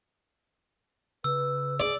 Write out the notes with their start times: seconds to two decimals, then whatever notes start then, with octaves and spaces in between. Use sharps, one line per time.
1.24 C#3 B4 E6
1.80 G#4 D5